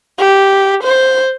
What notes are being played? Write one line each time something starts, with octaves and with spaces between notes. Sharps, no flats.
G4
C5